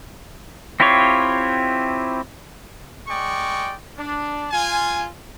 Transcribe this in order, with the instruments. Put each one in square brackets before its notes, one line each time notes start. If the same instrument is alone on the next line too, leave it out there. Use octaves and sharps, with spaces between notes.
[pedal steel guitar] C4 E4 F4 G4 C#5
[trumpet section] G#3 D5 G5 C#6
D4
F4 G#5